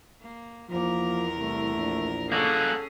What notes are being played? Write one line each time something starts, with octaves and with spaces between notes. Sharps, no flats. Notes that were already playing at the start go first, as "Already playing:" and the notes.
A#3
E2 F3 A#3 A#4
C2 A3
A#1
A#3 C#4 F#4 G#4 A4